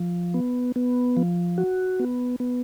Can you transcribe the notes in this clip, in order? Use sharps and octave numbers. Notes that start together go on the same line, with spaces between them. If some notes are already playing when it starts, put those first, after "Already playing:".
Already playing: F3
B3
B3
F3
F#4
B3
B3